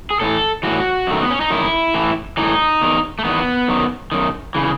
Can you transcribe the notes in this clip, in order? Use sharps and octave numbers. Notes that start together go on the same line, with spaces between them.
G#4
A2 E3 A4
A2 E3 F#4
F#2 D#3 A3
B3
C#4
D#4
F#2 D#3 E4
A2 E3
A2 E3 D#4
E2 D#3
A3
E2 D#3 B3
F#2 D#3
F#2 D#3
C#3 E3